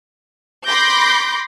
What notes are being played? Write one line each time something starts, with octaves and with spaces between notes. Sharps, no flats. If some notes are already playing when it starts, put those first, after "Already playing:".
B5 C6 D6 G6 A#6